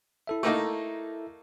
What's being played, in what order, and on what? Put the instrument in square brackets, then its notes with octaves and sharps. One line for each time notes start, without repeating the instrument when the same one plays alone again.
[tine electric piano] E4 A4 E5
[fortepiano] A3 A#3 D#4